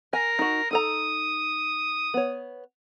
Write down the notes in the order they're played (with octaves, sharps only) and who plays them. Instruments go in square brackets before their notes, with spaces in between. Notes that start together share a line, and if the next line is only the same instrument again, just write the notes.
[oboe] A#4 [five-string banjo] G#5
[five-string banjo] D#4 F#4
[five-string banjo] D#4 A4 A#5 [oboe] D#6
[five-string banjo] B3 C#5